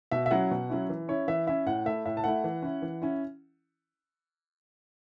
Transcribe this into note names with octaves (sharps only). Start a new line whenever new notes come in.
B2 E5
E5
F#3 C#4 E4 F#5
B2
F#3 C#4 E4
E3
C#4 E4 C#5
E3 E5
C#4 E4 E5
A2 F#5
A3 E4 E5
A2 E5
A5
A3 E4 F#5
E3
C#4 E4
E3
C#4 E4